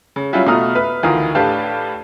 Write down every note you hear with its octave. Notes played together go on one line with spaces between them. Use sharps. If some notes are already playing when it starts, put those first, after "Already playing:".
C#3
F#3 G3 C#4 E4 F4
B2 A3 F4 A#5 D#6 F6
B4 E5 F6
D2 D#3 E3 F4 A#5 D#6
A2 D4 G4 B4 F5 A5